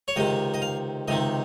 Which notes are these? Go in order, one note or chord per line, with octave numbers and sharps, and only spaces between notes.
C#5
C#2 C3 D#3 D#5
D#5
F5
C#2 C3 D#3 D#5